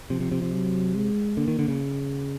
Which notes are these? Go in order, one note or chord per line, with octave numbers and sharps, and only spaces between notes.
C3 F3
C3
C3
C3
F#3
G#3
D3 A#3
D#3
D3
C#3